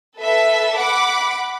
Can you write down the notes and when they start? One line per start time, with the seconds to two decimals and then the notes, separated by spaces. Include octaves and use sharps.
0.20 A4 B4 E5
0.78 F#5 B5 D6